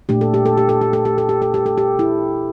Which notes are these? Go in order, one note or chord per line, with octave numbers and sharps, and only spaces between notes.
A#2 A3 D4 G4
A4
G4
A4
G4
A4
G4
A4
G4
A4
G4
A4
G4
A4
G4
E4